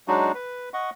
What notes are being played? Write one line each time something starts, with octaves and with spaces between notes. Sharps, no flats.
F#3 G#3 D4 D#4 F#4
B4
D#5 F#5 C#6